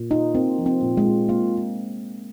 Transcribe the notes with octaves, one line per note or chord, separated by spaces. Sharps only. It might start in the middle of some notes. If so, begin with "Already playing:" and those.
Already playing: A#2
D#4 F4
A#3 C4
F3
C4
A#2
G#3
F4
A#3 F4